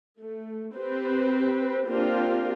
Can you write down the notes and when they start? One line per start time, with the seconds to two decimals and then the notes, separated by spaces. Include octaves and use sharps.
0.18 A3
0.75 C4 G4 B4 C5
1.86 A#3 C4 D4 F4 G4 A#4